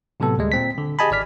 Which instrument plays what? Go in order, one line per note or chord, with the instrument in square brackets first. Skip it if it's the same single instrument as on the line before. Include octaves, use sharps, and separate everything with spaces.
[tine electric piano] A2 C3 F#3 B3 A4
D2 G3 G#3
A#2 C4 B6
D3
G4 G#4 D#5 G#5 A5 B5
G#1 D5 F6 B6